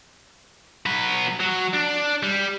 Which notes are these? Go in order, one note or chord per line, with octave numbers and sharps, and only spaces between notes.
F#3 B4
F#3
D4
G3